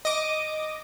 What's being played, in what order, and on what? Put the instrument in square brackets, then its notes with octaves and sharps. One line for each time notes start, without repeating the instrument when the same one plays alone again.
[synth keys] D#5 D6